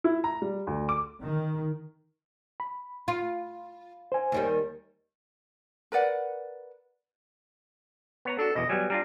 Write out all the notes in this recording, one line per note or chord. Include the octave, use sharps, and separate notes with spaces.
E4
A#5
G3
D2
D6
D#3
B5
F4
C5 G#5
D#2 D#3 G3
A#4 B4 D5 F#5
B3 C#5 A#5
D4 F#4 A4
E2 B2 D#5
F#3 G3 B3 G#5
G3 D4 F4 A#5